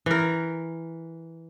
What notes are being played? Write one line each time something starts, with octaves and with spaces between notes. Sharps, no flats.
E3 A#4